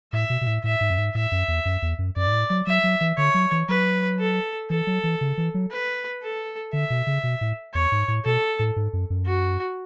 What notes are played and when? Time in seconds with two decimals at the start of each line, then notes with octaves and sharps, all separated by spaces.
0.13 A2 E5
0.30 B2
0.41 B2
0.47 A2
0.64 A2 E5
0.81 G#2
0.90 F#2
0.98 G#2
1.14 A2 E5
1.32 F#2
1.48 E2
1.65 F#2
1.82 E2
1.99 F#2
2.16 F#2 D5
2.27 G#2
2.32 A2
2.50 F#3
2.67 F#3 E5
2.84 F#3
3.01 E3
3.17 D3 C#5
3.34 F#3
3.51 E3
3.69 F#3 B4
4.19 A4
4.70 E3 A4
4.87 F#3
5.04 E3
5.21 C#3
5.37 E3
5.54 F#3
5.71 B4
6.22 A4
6.73 D3 E5
6.90 B2
7.07 C#3
7.23 B2
7.41 A2
7.74 E2 C#5
7.92 G#2
8.08 A2
8.25 B2 A4
8.59 A2
8.76 G#2
8.93 F#2
9.10 F#2
9.26 F#4